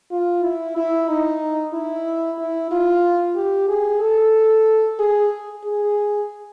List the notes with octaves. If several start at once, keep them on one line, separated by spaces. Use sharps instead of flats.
F4
E4
E4
D#4
E4
E4
F4
G4
G#4
A4
G#4
G#4